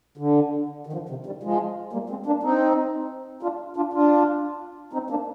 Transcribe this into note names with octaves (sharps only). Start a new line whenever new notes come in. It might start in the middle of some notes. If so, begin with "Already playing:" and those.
D3
D#3
D3 F3
C3 D#3
D#3 G3
F3 G#3
G3 A#3
G#3 C4
A#3 D4
C4 D#4
D4 F4
D4 F4
D4 F4
C4 D#4
A#3 D4